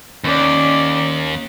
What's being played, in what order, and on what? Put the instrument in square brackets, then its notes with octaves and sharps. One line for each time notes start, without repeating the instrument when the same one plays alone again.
[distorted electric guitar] D#2 [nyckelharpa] C#4 D5